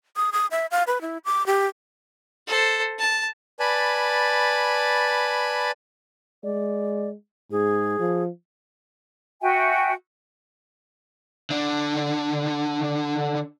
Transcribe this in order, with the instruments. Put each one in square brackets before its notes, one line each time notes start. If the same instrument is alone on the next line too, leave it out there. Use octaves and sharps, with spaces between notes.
[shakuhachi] D#6
D#6
E5
F5
B4
E4
D6
G4
[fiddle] A4 C5
A5
[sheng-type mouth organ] B4 D5 G#5 A5 B5
[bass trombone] G#3 [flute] D5
[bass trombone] G#2 [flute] G#4
[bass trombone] F3
[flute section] F#4 E5 G5 G#5
[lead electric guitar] D3 D4